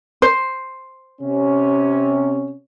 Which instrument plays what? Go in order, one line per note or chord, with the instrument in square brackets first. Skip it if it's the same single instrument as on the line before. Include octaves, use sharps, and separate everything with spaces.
[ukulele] C5
[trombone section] C3 C#4